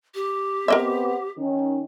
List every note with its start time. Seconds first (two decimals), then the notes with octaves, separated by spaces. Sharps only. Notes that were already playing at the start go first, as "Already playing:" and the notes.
0.15 G4
0.68 B3 C4 A#4 D#5 E5
1.38 D#3 C#4